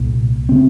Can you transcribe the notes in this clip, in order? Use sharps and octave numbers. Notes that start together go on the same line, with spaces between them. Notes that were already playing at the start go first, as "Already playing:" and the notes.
Already playing: C2 A#2
C#3 C4